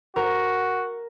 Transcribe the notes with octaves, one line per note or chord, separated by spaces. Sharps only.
F#4 A#4